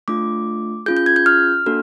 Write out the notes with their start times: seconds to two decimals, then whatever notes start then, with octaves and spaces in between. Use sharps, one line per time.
0.08 A3 D4 F4 D6
0.86 C#4 F4 G#4 G6
0.97 G6
1.06 G#6
1.16 G6
1.26 F6
1.66 A#3 D4 F#4 A4